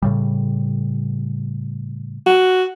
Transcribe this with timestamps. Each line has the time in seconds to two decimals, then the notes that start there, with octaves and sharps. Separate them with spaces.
0.02 A2 C#3 G3
2.26 F#4